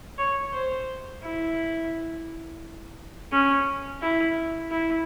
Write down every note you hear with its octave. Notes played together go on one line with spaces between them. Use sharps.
C#5
C5
E4
C#4
E4
E4